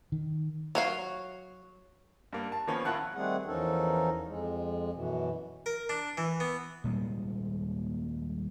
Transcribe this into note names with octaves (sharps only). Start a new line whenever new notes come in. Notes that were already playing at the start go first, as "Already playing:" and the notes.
D#3
F#3 C#5 F5
G2 A#3
A5
D#3 F3 A#3 B3 C#4
A#1 E4 F4 F#5 A5 F#6
D#3 G3 A3 C4 G#4 F#5
E2 F3 C#4 D#4 A4 A#4
F2 G#3
F#2 B2 E3
A#4
D4
E3
B3
D#1 A#2 G3 G#3